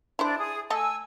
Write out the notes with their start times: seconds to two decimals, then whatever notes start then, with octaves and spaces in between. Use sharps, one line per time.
0.19 D4 E4 C5 D5
0.39 G#4 D#6
0.70 A3 A4 D#5 G#5 E6